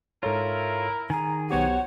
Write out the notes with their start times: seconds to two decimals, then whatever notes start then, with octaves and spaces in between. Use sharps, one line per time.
0.23 G#2 E4 F4 A4 A#4 C#5
1.10 D#3 G#4 G#5 A#5
1.51 B1 B3 F#4 G4 C5 C#5 F#5